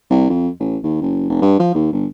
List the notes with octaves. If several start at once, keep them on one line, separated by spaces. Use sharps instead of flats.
C2
F2
A1
D#2
F#1
F1
G2
F3
D#2
G1